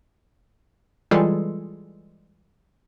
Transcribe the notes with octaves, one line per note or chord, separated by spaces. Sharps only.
E3 G3 G#3 F4 G#4 A4